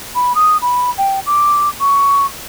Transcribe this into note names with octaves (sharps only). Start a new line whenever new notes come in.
B5
D#6
B5
G5
D6
C#6